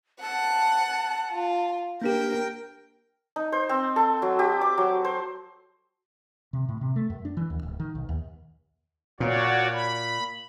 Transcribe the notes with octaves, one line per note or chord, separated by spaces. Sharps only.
F#5 A5
F4
A#3 D4 G4 A#4 G5
D#4
C5
C4
A4
F#3
G4
D6
F#3
C5
C3
A2
C3
A3
F#2
D4
E3
D#2
D1
D#3
B1
D#2
A#2 F#4 C#5 D5
B5